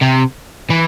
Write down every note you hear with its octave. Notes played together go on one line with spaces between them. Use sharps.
C3
E3